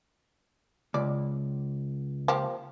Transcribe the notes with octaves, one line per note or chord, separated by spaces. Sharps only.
C#2 D5
F3 A#3 G4